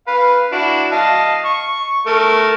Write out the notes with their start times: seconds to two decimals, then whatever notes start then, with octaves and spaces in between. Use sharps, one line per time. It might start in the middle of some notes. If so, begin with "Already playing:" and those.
0.07 B4 F5
0.52 D4 E4 F#4
0.92 D#5 F5 A5
1.45 C#6
2.07 A3 A#4